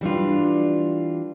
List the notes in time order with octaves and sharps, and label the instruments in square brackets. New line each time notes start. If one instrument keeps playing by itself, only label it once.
[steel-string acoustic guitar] E3 G3 D4 F4